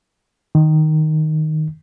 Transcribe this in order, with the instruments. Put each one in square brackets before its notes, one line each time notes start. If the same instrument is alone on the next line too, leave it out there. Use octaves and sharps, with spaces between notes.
[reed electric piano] D#3